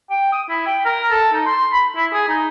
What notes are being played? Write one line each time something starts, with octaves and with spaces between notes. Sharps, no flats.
G5
D#6
E4
G5
A#4
A4
D#4
C6
B5
E4
G#4
D#4